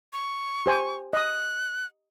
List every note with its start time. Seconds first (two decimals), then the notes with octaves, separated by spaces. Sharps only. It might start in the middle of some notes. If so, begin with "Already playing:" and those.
0.13 C#6
0.66 G4 C5 G#5
1.13 D#5 D#6 F#6